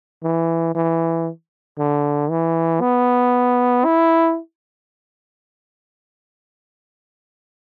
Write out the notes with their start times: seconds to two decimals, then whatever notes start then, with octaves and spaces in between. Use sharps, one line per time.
0.24 E3
0.75 E3
1.79 D3
2.30 E3
2.81 B3
3.85 E4